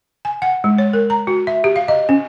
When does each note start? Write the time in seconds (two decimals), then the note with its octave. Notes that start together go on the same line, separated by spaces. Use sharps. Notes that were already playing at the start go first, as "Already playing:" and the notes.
0.25 G#5
0.42 F#5
0.64 G#3
0.78 C#5
0.93 A#4
1.10 A#5
1.27 F#4
1.47 E5
1.64 G4
1.76 F5
1.88 D#5
2.09 C#4